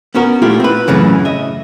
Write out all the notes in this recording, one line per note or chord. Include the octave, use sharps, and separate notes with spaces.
B3 C#4 F#4 A#4
A#2 A3 E4 F4 G4
C4 B4
F#2 A2 C#3 E3
D#5 E5